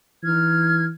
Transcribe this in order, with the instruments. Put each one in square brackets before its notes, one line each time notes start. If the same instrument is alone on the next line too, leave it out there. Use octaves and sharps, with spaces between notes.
[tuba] E3 [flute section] D#4 F6 G#6